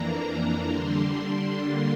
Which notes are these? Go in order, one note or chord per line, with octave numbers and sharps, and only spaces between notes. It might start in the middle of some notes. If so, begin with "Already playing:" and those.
Already playing: F2 E3 A#3 D4 A#5
D3 G3 D4 C6
D3 G3 A#3